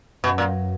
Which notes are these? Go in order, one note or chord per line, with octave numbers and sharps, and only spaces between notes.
F#2 B2
A#2